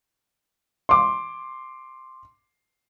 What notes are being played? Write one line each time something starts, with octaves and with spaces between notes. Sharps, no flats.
C6 D6